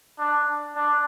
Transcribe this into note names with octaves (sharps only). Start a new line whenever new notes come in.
D4
D4